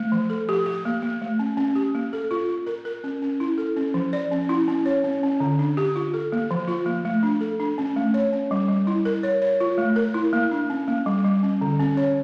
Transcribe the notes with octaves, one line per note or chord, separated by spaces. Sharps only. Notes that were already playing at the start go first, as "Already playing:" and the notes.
Already playing: A3
F3
A4
G4
G4
A#3
A#3
A3
C#4
C#4
G4
A#3
A4
F4
F4
A#4
A#4
C#4
C#4
E4
A4
C#4
F3
D5
C#4
E4
C#4
C#5
C#4
C#4
D3
D4
G4
F4
A4
A#3
F3
F4
A#3
A3
D4
A4
D4
C#4
A3
C#5
C#4
G3
G3
E4
A#4
C#5
C#5
F4
A3
A#4
E4
A#3
D4
C#4
A#3
G3
G3
C#4
D3
C#4
C#5